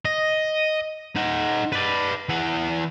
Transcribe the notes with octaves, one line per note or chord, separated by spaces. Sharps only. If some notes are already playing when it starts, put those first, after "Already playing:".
D#5
D#4 F#5
B4 D5
E3 F#5